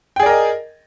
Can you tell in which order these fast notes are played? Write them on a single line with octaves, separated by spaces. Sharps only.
G5 G#4 D5 A#4 D#5